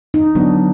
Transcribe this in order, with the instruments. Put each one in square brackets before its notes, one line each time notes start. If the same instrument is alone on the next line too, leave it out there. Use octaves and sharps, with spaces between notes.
[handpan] D#4
[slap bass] D3 F#3 B3 [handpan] D4